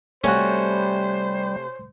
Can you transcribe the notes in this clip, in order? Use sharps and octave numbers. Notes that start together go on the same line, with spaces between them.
C3 G3 A3 C#4 F#4 C5